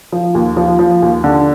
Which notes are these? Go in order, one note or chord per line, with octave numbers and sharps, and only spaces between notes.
F3
D#2
F3
F3
D#2
D3